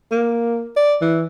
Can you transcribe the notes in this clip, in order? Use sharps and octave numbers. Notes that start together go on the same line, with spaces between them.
A#3
D5
E3